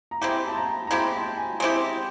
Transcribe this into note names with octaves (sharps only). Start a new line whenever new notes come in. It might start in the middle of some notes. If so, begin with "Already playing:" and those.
A#5
G#3 C4 E4 G4 B5
A5
A#5
A#5
G#3 C4 E4 G4 B5
A5
G#5
G#3 C4 E4 G4